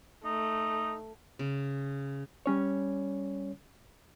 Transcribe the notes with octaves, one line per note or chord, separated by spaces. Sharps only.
A3 D#4
C#3
G3 C#4 C#5